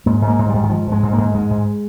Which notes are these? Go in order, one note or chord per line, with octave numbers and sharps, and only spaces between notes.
G#2 A#3
G#2
A#3
G#2
G#2 G3
D#3
G#2 F3
G#2
G#3
G#2
G#2 A#3
G#2 G#3
G#2